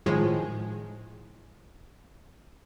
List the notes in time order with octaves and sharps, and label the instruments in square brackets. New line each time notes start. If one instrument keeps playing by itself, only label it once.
[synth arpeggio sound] A2 D#3 F3 G#3